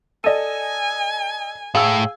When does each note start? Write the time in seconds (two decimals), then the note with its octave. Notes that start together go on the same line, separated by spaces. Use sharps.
0.24 A4 D5 D#5 G#5 D#7
1.75 A2 G#4 F5 E6